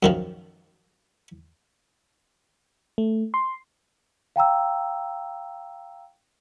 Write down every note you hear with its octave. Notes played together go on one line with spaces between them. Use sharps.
F#2 D#3 F3
A3
C6
F5 G5 A#5 E6